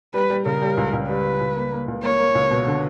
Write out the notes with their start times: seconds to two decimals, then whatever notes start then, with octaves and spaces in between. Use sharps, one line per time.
0.14 G3 B4
0.30 G3
0.45 C#3 A#4
0.62 G3
0.77 C#2
0.93 C#2
1.09 G3 B4
1.25 G3
1.40 C#2
1.56 A#3
1.72 A#3
1.88 C#2
2.03 A#3 C#5
2.19 A#3
2.35 C#2
2.51 B2
2.67 D3